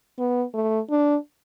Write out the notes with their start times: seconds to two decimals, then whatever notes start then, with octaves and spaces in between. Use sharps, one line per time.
0.19 B3
0.54 A3
0.91 D4